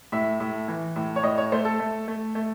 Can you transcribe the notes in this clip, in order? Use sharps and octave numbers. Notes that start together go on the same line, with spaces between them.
A2 E5
A2
E3
A2
C#5
A2 D#5
C#5
A3 C5
A4
A3
A3
A3